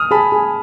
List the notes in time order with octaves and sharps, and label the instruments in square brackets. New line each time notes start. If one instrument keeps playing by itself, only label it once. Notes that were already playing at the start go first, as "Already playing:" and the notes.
Already playing: [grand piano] D#6 F6
[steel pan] G#4 [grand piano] A5 B5
[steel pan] G#4